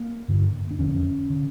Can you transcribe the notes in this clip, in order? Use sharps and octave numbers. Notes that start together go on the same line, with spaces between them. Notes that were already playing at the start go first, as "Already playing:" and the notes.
Already playing: A#3
G2 D3
D4
F2 D3 C#4
D3